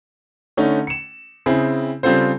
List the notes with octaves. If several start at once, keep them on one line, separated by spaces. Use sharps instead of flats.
D3 A3 C#4 D#4
C#7 E7
C#3 C4 E4 G#4 C5
C#3 G3 C4 F4 A4 C5